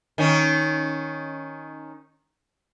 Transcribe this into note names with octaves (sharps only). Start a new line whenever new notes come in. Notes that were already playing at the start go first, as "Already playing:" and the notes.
D#3 C#4